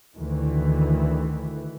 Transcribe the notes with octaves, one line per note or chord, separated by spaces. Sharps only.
D2 D#3 E3